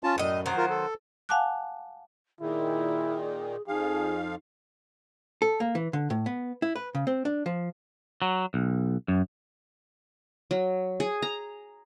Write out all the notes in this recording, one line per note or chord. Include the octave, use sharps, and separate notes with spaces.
C#4 F4 A5
F#2 A2 D#5
D#3 F#3 C5
F4 A#4
A4
F5 F#5 G#5 A5 D6 F#6
A#2 D#3 E4 G#4
F2 F3 D#4 G#4 F5
A4
A#3
E3
D3
A2
B3
E4
B4
C#3
C4
D4
F3
F#3
B1
F#2
F#3
G#4
A#5